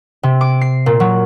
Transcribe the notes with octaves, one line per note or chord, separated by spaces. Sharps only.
C3
D6
C7
A#2
F#3